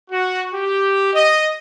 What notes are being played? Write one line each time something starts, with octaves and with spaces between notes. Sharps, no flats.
F#4
G4
D#5